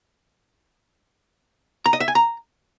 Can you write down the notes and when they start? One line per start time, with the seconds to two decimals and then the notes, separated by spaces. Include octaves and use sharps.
1.86 A#5
1.93 D#5
2.00 E5
2.08 G#5
2.15 A#5